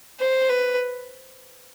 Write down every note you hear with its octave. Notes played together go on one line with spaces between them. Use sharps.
C5
B4